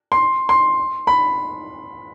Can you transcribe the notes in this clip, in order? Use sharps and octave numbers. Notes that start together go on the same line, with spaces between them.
C6
C6
B5